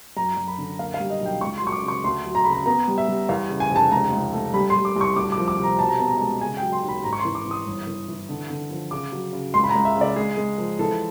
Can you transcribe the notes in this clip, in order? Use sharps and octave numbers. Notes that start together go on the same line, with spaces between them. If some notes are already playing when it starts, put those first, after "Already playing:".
F#2 A#5
F#2
B5
D3
A#3 F5
F5
G3
D#5
B1 G5
C#2 C#6
C6
F#3 C#6
D6
C#3 C#6
D2 C6
F#3
A#5
C#3 B5
A#5
B3 A#5
G3
E5
G3
E2 F5
C#3
G#5
F1
A5
C#2 A#5
C#2
A3
G3 B5
C6
G3
D6
C2
C#6
D2 D6
D6
F3
D6
C3
A#5
B2 A5
A#5
B3 A5
A#5
A5
G#3
C#3 G#5
G5
F#3
C6
D#2
B5
G#1 A#5
C#6
C6
E3
D6
E3
D#6
G1
E3
E3
D3
D3
F3
C#3 D6
F#3
C#3
C#2 C6
B5
A#5
C#2
E5
C#3
D5
G#3 G#4
G#3
F3
E3 A4